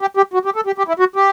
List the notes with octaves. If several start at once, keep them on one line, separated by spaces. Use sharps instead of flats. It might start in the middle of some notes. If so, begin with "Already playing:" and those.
G4
G4
F#4
G4
A4
G4
G4
E4
F#4
G4